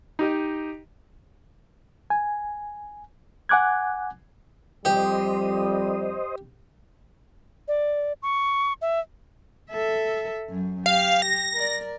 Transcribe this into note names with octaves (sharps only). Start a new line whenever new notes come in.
D#4 G4 D#5
G#5
F#5 G#5 D6 F#6 G#6
F2 G3 G4 C5 D#5
D5
C#6
E5
A4 E5
F#2
G4 F5
A#6
A#4 D5